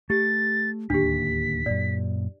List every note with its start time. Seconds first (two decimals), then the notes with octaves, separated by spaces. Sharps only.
0.10 A3 G4 A6
0.90 D1 D#2 A#3 D4 G4 B6
1.66 F#2 A#2 D5